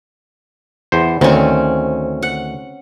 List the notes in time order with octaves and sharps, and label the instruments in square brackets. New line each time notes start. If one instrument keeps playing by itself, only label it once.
[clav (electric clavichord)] E2 C5
[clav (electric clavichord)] D2 D#3 [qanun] C4 C#4
[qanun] F#5